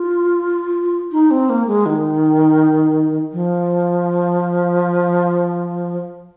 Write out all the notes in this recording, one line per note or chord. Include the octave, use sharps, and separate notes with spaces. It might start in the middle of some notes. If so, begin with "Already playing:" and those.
Already playing: F4
D#4
C4
A#3
G#3
D#3
F3